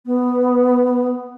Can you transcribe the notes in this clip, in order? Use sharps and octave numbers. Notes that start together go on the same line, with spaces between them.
B3